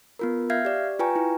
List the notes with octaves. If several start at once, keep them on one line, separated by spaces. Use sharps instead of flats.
B3 F4 A#4
E5 F5 F6 G6 G#6 C7
G4 D5
F4 B4 G5 G#5 A#5 C#6
E4